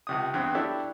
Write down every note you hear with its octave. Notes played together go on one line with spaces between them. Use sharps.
C#2 C3 D#6
E2 G2 C4 F#5
F#3 D4 E4 G4 A4 E5